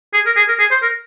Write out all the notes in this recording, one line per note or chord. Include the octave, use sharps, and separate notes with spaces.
G#4
A#4
G#4
A#4
G#4
C5
A#4